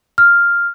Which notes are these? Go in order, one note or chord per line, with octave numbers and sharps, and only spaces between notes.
F6